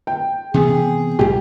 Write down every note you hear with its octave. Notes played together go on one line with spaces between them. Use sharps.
G5
C3 E3 B3 G#4
B1 G#2 G4